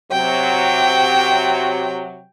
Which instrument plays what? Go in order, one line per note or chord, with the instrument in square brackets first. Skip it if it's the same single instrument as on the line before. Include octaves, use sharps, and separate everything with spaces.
[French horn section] C3 F#3 [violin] G5